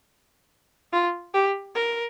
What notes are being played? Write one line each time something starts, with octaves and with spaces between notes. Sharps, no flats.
F4
G4
A#4